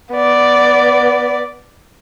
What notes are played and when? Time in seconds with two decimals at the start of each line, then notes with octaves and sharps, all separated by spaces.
0.13 B3 D5